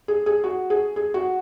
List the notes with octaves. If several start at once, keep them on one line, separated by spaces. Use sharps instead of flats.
G#4
G#4
F#4
G#4
G#4
F#4